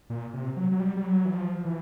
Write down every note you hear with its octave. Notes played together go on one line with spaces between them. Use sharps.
A#2
C3
F#3
F#3
G3
G3
F#3
E3
F3
E3